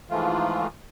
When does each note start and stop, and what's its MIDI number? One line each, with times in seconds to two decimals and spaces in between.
0.10 0.67 44
0.10 0.67 52
0.10 0.67 53
0.10 0.67 57
0.10 0.67 65